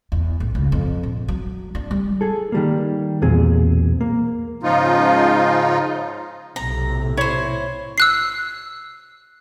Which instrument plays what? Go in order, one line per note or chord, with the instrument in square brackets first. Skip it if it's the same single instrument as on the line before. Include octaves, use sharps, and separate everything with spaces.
[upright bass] E2
A1
C#2
F2
A#1
F#3
D4
G3
[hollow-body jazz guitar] G#4 A4
D#3 G3 A#3
B1 E2 A#2 C4 G#4
A#3
[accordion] G#2 C#3 F3 D#4 F4
[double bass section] B1 A2 C3 [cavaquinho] A#5
[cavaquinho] E4 C5 [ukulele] C#5
[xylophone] E6 F#6 C7